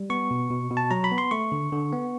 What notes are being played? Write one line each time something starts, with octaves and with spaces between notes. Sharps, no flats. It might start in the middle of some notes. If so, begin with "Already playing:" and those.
Already playing: G3
B3 C#6
B2
B2
B2
A5
F#3 A#5
B5
B3
C6
A3 C#6
D3
D3
B3